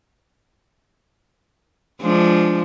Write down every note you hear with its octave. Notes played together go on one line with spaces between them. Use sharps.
F3 G#3 D4